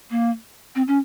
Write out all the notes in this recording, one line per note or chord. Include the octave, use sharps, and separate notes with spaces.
A#3
C4
C#4